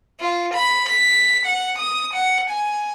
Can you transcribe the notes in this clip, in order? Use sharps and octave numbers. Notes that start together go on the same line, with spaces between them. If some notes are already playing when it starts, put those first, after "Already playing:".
F4
B5
B6
F#5
D#6
F#5
G#5